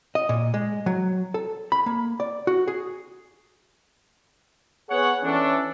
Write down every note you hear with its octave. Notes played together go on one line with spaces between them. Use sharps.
D#5
A#2
G#3
F#3
A4
B5
A#3
D5
F#4
G#4
B3 G#4 C#5 F#5
E3 C#4 D4 A4